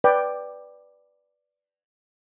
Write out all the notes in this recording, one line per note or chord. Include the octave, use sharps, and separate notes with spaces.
B4 D5 G5